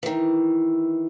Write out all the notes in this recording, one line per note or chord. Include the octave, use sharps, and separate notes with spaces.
D#3 E3